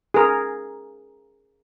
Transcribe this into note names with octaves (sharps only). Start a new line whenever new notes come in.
G#4 A#4